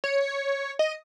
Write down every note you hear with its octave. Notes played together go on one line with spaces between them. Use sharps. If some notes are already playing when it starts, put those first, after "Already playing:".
C#5
D#5